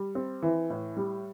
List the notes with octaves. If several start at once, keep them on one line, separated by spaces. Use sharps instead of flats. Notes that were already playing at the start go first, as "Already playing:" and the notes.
Already playing: G3
C4
E3
A2
G3